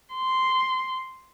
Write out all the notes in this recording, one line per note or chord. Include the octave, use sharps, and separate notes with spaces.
C6